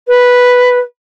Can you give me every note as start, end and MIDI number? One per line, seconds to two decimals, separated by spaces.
0.07 0.79 71